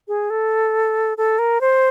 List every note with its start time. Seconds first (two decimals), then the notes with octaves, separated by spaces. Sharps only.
0.08 G#4
0.30 A4
1.18 A4
1.39 A#4
1.61 C5